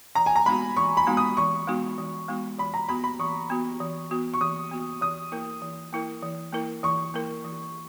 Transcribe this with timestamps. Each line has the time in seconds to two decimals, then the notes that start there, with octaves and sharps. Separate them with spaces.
0.15 E3 A#5
0.26 G#5
0.36 A#5
0.46 G#3 B3 D#4 F#4 B5
0.76 E3 C#6
0.97 B5
1.07 G#3 B3 D#4 F#4
1.17 D#6
1.37 E3 C#6
1.67 G#3 B3 D#4 F#4
1.98 E3
2.28 G#3 B3 D#4 F#4
2.59 E3 B5
2.74 A#5
2.89 B3 F#4 B5
3.04 B5
3.19 E3 C#6
3.50 B3 F#4
3.80 E3
4.11 B3 F#4
4.34 C#6
4.41 E3 D#6
4.71 B3 F#4
5.02 E3 D#6
5.32 A#3 E4 A#4
5.62 E3
5.93 A#3 E4 A#4
6.23 E3
6.53 A#3 E4 A#4
6.83 E3 C#6
7.14 A#3 E4 A#4
7.44 E3